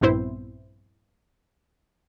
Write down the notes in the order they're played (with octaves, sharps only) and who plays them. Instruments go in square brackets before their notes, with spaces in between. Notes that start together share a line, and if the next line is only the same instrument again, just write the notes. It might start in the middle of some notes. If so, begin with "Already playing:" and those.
[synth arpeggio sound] A#1 G2 B3 C4 E4 C5